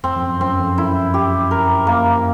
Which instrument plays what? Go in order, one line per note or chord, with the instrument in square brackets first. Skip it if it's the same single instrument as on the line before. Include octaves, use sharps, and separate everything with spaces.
[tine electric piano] F2 [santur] C4
[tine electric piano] F2
F#2
[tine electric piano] F#2 [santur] C4
[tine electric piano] F2
[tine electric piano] F#2 [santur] E4
[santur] G4
A#4
A#3